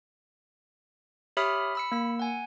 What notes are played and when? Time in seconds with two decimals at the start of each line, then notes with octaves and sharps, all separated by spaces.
1.37 G4 C#5 E5 B5 D#6 F6
1.75 B5 E6 C#7
1.92 A#3 E6
2.19 F#5 G#5